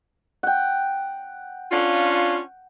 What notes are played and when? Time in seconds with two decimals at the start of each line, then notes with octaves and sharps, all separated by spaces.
0.43 F#5 G5
1.71 C#4 D4 F4